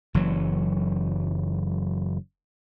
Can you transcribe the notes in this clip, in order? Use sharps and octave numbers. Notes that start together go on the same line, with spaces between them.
F#1 E3 F#3